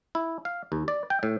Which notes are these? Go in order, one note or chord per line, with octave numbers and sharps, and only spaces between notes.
E4
F5
D#2
D5
G5
A2